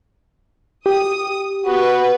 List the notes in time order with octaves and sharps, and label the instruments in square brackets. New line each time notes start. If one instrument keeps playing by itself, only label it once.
[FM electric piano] G4 [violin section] D#6
[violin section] B3 B4 [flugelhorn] F#4